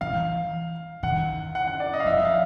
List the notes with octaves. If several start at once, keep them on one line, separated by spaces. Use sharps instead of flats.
E3 F5
D#3 F#5
F#5
F#5
D5
D#5
F5
F3 E5
E5
F5